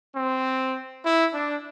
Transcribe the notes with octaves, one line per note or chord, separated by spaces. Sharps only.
C4
E4
D4